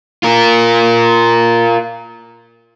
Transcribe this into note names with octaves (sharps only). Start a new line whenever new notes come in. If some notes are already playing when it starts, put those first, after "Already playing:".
F4 A#4